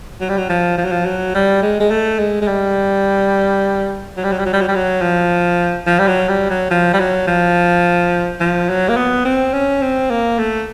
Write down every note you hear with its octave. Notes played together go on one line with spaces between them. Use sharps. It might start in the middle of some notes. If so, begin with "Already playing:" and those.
F#3
G3
F#3
F3
F3
F#3
F3
F#3
G3
G#3
G#3
A3
G#3
G#3
G3
F#3
G3
F#3
G3
F#3
G3
F#3
G3
F#3
F3
F3
G3
F#3
G3
F#3
F3
G3
F#3
F3
F3
F#3
A#3
B3
C4
C#4
C4
A#3
A3